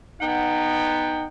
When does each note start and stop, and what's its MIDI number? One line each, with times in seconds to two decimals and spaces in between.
0.21 1.26 59
0.21 1.26 63
0.21 1.26 78
0.21 1.26 79